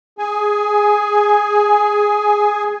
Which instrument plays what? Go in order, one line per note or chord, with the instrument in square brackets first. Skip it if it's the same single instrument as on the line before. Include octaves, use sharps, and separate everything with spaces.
[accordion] G#4 G#5